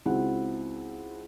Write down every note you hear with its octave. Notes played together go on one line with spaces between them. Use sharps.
C#2 C4 E4 F#4 F#5